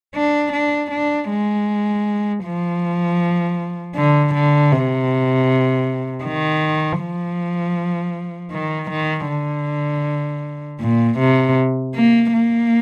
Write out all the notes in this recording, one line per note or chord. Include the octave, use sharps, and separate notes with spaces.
D4
D4
D4
G#3
F3
D3
D3
C3
D#3
F3
D#3
D#3
D3
A#2
C3
A#3
A#3